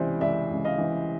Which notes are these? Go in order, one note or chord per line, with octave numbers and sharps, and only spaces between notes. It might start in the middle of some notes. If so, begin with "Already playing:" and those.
Already playing: C#2 C3 E3 C5 D5
C#2 D5 E5
C#2
D#5 F5
E3